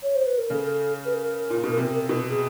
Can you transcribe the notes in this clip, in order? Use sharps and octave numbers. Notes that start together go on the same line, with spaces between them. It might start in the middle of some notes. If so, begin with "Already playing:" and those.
C#5
C5
B4
A#4
C#3 A4 A#4
B4
A#4
A#2
B2
C3
B2
G#4